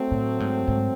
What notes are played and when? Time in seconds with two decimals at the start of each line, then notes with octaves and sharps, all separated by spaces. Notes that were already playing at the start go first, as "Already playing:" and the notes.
Already playing: F#3 A3 C4
0.11 A2
0.40 G#2
0.68 G#2